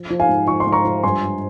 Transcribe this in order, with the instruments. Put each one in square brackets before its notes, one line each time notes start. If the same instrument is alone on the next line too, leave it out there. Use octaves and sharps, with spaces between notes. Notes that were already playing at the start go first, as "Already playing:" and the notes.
Already playing: [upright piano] F3
F3
F5 G#5
G#2
F3 C#6
C6
G#2
A#5 C#6
F3
G2 G#5 C6
F3